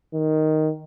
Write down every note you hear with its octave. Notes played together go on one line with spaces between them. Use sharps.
D#3